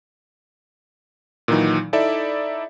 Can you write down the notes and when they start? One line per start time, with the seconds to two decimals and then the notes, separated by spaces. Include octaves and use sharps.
1.48 A#2 D#3 E3 F#3 D#4
1.93 D#4 E4 A4 D5 E5